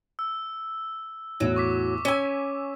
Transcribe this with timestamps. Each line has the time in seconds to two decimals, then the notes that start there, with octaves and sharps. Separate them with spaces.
0.19 E6
1.40 E2 A2 F#3 E4
1.56 C#6 D6 B6
2.05 C#4 C#5 G#5 E6